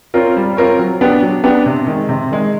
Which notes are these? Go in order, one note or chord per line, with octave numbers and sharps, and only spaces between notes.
C4 F4 A#4 C#5
G3
C4 F4 A#4 C#5
F#3
B3 D4 G4
F#3
B3 D4 G4
C3
D#3 G#3
C3
D#3 G#3